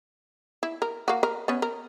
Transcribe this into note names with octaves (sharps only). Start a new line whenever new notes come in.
E4
A#4
A#3 F#4
A#4
B3 C#4
A#4